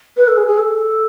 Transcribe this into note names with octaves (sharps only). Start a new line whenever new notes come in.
B4
A4
G#4
G#4
A4